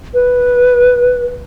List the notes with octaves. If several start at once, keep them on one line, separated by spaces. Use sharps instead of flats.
B4